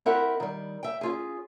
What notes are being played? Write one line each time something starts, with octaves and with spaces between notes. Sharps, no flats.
C4 E4 G4 A#4 E5 F#5
D#3 G3
E5 G5
C#4 F4 G#4